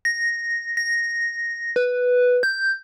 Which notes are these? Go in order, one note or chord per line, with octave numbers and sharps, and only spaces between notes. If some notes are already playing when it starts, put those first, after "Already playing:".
A#6
A#6
B4
G6